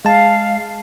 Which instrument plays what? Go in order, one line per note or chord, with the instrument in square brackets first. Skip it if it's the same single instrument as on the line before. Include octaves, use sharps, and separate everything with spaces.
[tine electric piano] G#3 A5 [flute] F5